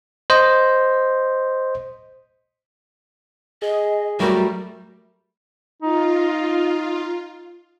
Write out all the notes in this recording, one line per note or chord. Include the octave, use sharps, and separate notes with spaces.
C5 D#5
G#4 D#5
F#3 G3 A3 F#4 G4 A#4
D#4 F4